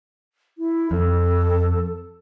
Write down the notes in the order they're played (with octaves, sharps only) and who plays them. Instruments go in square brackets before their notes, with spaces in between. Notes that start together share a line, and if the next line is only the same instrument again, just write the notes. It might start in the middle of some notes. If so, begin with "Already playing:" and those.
[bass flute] E4
[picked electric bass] F2 [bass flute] A4